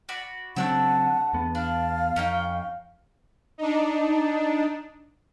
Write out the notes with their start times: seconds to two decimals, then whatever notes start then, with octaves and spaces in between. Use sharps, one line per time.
0.09 F#4 D5 B5
0.56 C#3 F#3 A3 C4 D4 F#5 E6
1.33 E2 B3
1.55 D4 F5
2.16 F2 C#4 D#4 G5
3.58 D4 D#4